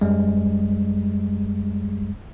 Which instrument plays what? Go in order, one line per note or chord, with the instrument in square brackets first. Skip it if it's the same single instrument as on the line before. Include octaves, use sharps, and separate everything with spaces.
[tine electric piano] F#2 G3 G#3